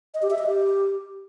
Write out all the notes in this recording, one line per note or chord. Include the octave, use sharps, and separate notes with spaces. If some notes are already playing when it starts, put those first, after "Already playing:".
D#5
G4
E5
D#5
G4